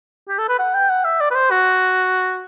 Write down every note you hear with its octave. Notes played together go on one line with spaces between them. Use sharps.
G4
A4
B4
F#5
G5
F#5
E5
D5
B4
C5
F#4